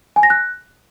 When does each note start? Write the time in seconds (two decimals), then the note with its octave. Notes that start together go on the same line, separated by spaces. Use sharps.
0.16 G#5
0.23 A#6
0.30 F#6